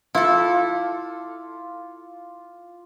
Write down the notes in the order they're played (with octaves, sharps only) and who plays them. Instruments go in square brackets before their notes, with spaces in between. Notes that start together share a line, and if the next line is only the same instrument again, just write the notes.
[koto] E4 A4 [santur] F4 F5 D6